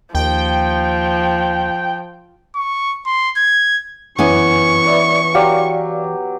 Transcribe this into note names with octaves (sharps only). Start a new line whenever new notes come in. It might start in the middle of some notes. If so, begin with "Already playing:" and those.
D#2 F3 G5
C#6
C6
G#6
F#2 E3 B3 C#4 G#5 C#6
B4 D5 E5
F#3 G4 D5 F5